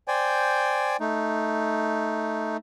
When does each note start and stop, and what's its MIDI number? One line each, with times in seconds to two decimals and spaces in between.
0.08 0.97 72
0.08 0.97 74
0.08 0.97 79
0.08 0.97 80
1.00 2.57 57
1.00 2.57 63